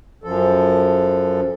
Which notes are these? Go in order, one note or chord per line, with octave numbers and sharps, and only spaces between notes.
F#2 F3 A4